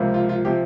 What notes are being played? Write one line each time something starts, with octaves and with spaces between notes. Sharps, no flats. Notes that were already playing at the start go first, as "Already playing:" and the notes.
Already playing: C#2 C3 F3 A#3
F4
F4
C3 F3 G4